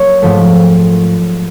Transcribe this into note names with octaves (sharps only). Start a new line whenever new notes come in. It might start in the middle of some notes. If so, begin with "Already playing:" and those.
Already playing: F#3 A#3 C#5
G#2 F3 A3